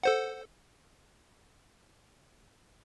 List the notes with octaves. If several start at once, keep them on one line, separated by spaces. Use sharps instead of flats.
A4 C5 F#5